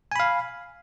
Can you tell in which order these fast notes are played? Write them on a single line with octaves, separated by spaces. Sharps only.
G#5 B5 F5